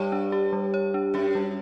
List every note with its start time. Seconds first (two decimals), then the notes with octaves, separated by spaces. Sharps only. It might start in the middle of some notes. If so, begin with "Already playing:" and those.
Already playing: G2 G3 C#5
0.12 D4
0.32 G4
0.53 G3
0.74 C#5
0.94 D4
1.14 F#2 G4
1.35 G3